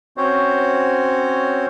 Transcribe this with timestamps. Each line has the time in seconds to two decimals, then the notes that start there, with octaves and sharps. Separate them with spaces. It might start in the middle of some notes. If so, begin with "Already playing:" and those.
0.17 C4 C#4 F#4 C5 C#5